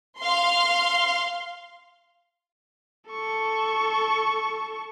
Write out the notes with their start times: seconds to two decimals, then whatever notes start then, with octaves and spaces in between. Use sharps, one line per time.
0.19 F5 C6
3.10 A4 C#6